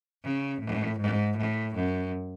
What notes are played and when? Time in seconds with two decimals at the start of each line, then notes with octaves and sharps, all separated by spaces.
0.24 C#3
0.61 A2
0.99 G#2
1.37 A2
1.75 F#2